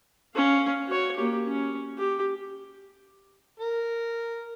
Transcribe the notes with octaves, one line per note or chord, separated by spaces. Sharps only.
C#4 F5
F#4 C#5
A#3 G4
C#4
G4
A#4